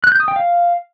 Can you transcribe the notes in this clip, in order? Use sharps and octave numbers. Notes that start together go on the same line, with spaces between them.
F#6
G6
D#6
G5
F5